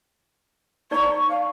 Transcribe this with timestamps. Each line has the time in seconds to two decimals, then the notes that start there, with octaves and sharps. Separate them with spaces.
0.91 D#4 D5 A#5 C#6
1.29 F5